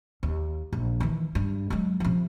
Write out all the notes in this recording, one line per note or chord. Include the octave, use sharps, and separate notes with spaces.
D#2
A#1
D#3 E3
G2
F#3 G#3
C3 F3